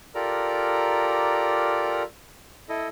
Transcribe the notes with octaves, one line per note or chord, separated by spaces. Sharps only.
F4 G4 A4 A#4 D5 A#5
E4 A4 D#5